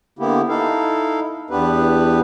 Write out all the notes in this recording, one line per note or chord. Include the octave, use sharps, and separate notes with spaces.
D3 A#3 B3 E4 G4
D#4 E4 A4 F5
E2 B3 D4 G4 B4